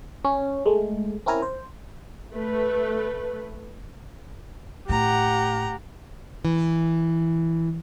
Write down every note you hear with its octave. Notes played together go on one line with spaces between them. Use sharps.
C#4
G#3 A3
C4 C#4 E4 A#4 G#5 A#5
C5
A3 B4
A2 G4 F#5 A#5
E3